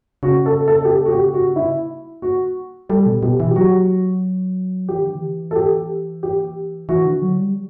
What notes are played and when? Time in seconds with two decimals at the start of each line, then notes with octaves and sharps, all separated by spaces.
0.23 C#3 F#4
0.46 A4
0.68 A4
0.85 G4
0.89 A4
1.05 F#4
1.11 G4
1.34 F#4
1.56 E4
2.22 F#4
2.89 G3 A4
3.06 B2
3.23 B2 G4
3.40 E3
3.51 G4
3.56 F#3 F#4
4.89 E3 G4
5.02 D3
5.15 E3
5.51 A4
5.56 G4
6.23 G4
6.89 E3 F#4
7.05 D3
7.22 F#3
7.39 G3